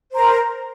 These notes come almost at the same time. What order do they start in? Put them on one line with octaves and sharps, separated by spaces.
C5 A#5 A#4